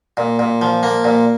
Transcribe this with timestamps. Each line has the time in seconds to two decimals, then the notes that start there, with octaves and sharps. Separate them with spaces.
0.17 A#2
0.39 A#2
0.62 F3
0.83 A#3
1.04 A#2